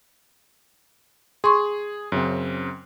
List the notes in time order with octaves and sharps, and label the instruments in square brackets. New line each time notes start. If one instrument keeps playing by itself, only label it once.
[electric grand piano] G#4 [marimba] C6 C#6
[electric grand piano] F#2 C#3 C4